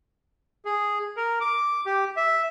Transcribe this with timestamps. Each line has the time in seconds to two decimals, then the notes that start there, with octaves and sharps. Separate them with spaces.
0.65 G#4
1.17 A#4
1.41 D6
1.86 G4
2.17 E5